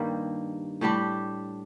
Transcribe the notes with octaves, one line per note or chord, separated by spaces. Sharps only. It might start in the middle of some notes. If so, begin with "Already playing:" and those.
Already playing: G2 D#3 G3 A#3
A2 G3 D4 G4